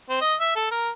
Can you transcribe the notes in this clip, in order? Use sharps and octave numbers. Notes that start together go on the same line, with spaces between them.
C4
D#5
E5
A4
A#4